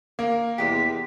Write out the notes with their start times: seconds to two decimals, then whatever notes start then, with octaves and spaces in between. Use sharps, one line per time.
0.19 A#3 A#4
0.58 E2 C3 G#3 G4 B6